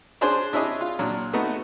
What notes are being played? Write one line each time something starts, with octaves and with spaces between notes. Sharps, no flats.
C#4 D4 G#4 C5
D4 E4 G#4 C#5 D#5
F4
A#2 F#3 D4
A3 B3 D#4 F#4